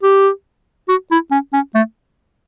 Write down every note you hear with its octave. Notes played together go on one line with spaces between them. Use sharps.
G4
F#4
E4
C#4
C#4
A3